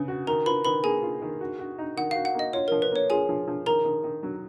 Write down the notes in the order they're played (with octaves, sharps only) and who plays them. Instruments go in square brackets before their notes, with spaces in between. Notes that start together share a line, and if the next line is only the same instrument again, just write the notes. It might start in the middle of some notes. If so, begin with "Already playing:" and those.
Already playing: [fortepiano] C#3 [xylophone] B4
[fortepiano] F#4
[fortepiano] D#3 [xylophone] A#4 A#5
[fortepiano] F4 [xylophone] B4 B5
[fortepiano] D#3 [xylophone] B4 B5
[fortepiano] A#3 [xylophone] G#4 G#5
[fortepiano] F4
D#3
F#4
F#4
D#4
[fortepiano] D#3 [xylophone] F#5
[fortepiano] F#4 [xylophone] F5
[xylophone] F#5
[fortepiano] A#3 [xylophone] D#5
[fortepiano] F4 [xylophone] C#5
[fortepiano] F3 [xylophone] A#4
[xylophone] B4
[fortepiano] A#3 [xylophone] C#5
[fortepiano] F4 [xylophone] G#4 G#5
[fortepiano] F3
F3
[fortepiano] D#3 [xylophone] A#4 A#5
[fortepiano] D#3
D#3
F#3